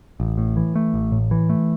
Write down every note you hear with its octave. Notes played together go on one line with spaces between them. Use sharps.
A1
A2
E3
A3
A1
A2
E3
A3